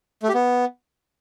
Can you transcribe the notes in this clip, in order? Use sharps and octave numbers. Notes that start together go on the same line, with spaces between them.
A3
G4
B3